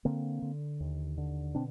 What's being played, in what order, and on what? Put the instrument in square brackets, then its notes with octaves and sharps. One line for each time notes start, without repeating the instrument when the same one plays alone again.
[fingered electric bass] D3 A#3 C4
D3
D#2
D3
B2 C4 D4